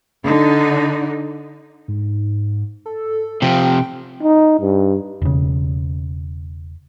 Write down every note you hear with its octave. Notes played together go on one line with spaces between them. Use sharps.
D3 D#4
G#2
A4
C3 F3 G5
D#4
G2
E1 C#3